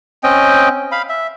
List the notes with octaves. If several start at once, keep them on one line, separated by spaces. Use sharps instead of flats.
C4 C#4 D#5 G5
F5 B5
E5